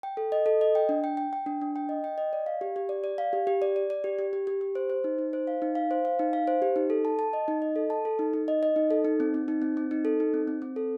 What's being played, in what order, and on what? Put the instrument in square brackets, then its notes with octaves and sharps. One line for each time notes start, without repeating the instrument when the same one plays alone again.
[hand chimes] G5
A4
D#5
A4
D#5
G5
D4
G5
G5
G5
D4
D4
G5
D#5
G5
D#5
D5
F5
G4
G4
D5
D5
F5
G4
G4
D5
D5
D5
G4
G4
G4
G4
G4
C5
C5
D#4
D#4
C5
F5
D#4
F5
C5
F5
D#4
F5
C5
G4
D#4
A4
A5
A5
D#5
D#4
D#5
A4
A5
A4
D#4
D#4
D#5
D#5
D#4
A4
D#4
C4
C4
D#4
C4
C4
D#4
A4
D#4
C4
C4
C4
A4